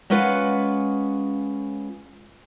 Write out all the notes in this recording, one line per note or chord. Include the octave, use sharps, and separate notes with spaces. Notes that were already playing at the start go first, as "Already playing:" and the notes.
G#3 C#4 F4 B4 F#5